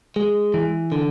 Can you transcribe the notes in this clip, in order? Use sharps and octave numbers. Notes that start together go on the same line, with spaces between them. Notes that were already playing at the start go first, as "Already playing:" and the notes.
G#3
E3
D3